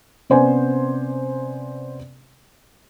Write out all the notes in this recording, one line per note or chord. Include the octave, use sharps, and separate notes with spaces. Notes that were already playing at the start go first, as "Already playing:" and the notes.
C3 B3 C#4 C5 D5 G#5